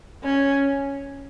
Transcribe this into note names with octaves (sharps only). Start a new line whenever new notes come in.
C#4